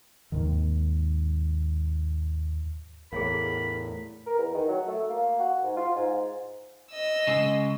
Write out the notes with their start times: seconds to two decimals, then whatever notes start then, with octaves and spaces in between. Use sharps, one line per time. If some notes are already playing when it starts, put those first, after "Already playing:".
0.32 D#2 G#2 D#3
3.13 E2 A2 G#4 A#4 C#5 F5 B5
4.26 A#4
4.38 E2
4.54 D#3
4.68 F#3
4.87 A3
5.09 A#3
5.39 F#4
5.63 G#2
5.77 F4
5.95 G#2
6.92 D#5 E6
7.27 C#3 G#3